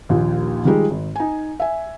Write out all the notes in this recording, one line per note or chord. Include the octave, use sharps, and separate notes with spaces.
A#1 D#2 A#2
D#3 F3 G3 G#3 D#4
G#1
D#4 G#5
E5 G#5